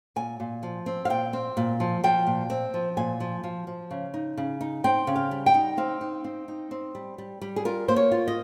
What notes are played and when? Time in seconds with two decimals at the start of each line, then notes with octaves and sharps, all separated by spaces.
0.16 A#2 G#5
0.40 A#2
0.63 F3
0.86 C4
1.05 F5
1.10 A#2 G5
1.33 C4
1.57 A#2
1.80 F3
2.04 F3 G5
2.27 A#2
2.50 C4
2.74 F3
2.97 A#2 G#5
3.20 F3
3.44 F3
3.67 F3
3.91 C#3
4.14 D#4
4.37 C#3
4.61 D#4
4.84 C4 G5
5.07 C#3
5.16 F5
5.31 G3
5.46 G5
5.54 D#4
5.77 C4 F5
6.01 D#4
6.24 C4
6.48 D#4
6.71 C4
6.95 G3
7.18 G3
7.42 G3
7.56 G#4
7.65 F4 A#4
7.88 A#3 C5
7.96 C#5
8.12 F4
8.28 D#5